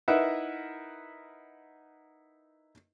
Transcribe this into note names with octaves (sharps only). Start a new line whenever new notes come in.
D#4 E4 A#4 B4 E5 F#5